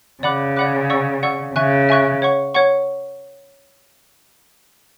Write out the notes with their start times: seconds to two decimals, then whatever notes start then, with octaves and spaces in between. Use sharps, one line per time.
0.23 C#3 D5 F#5 B5 D6 F#6
0.56 D5 F#5 B5 D6 F#6
0.90 D5 F#5 C#6 E6
1.23 D5 F#5 C#6 E6
1.55 C#3 E5 G#5 C#6 F#6
1.89 E5 G#5 C#6 F#6
2.22 C#5 F#5 C#6
2.54 C#5 F#5 C#6